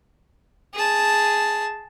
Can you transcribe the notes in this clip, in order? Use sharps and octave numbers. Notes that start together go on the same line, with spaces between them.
G#4 A5